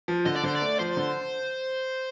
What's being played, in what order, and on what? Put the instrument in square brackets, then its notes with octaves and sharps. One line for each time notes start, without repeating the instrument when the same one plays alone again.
[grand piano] F3
[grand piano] D3 [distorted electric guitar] D#5
[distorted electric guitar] D5
[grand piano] D3 [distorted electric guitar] C5
[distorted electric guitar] D5
[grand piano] A3
[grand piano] F3 [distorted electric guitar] C5
[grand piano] D3